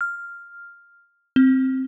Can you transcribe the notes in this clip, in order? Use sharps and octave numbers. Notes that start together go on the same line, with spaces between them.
F6
C4